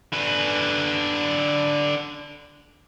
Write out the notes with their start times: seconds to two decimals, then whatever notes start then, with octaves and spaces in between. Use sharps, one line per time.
0.13 D3 B4